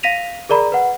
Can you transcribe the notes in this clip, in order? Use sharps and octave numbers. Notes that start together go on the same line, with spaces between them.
F5 A#6 B6 D#7 F7
G#4 A#4 D5 A#5 B5
B4 F#5